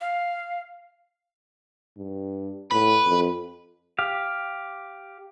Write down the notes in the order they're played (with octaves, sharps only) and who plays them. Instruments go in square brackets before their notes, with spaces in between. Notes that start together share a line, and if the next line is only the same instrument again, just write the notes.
[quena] F5
[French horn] G2
[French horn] A2 [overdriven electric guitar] B4
[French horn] F2
[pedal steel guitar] G4 F5